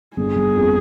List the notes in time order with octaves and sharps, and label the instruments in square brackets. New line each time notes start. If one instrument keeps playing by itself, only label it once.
[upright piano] G1 [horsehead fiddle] G#4
[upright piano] G1
F2